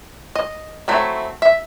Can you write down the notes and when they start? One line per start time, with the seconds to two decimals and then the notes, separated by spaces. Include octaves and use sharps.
0.36 D#5
0.88 F#3 A3 C4 E4
1.42 E5